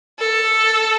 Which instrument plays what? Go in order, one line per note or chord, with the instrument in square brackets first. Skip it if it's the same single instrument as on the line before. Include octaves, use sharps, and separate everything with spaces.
[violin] A4